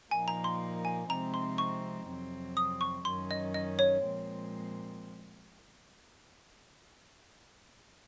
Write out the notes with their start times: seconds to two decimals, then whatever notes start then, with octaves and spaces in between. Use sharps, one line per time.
0.11 A#2 F3 A#3 D#4 G#5
0.28 A#5
0.44 C6
0.85 G#5
1.10 C3 F3 G#3 C4 D#4 A#5
1.34 C6
1.58 C#6
2.07 F2 C3 F#3 C4
2.57 D#6
2.81 C#6
3.05 F#2 D#3 F#3 C#4 C6
3.31 D#5
3.54 D#5
3.79 C#5
4.04 A#2 F3 G#3 C4